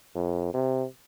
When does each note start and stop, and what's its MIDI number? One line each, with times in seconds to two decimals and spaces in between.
0.16 0.53 41
0.54 0.86 48